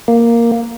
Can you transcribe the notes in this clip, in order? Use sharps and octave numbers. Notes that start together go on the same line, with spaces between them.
A#3